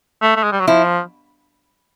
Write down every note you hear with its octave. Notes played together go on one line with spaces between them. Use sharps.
A3
A3
G#3
G3
F#3
F3 E4